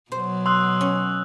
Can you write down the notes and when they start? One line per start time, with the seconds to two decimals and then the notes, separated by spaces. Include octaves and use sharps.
0.12 B2 F#3 C5
0.46 C6 D#6 E6 F#6
0.81 C#4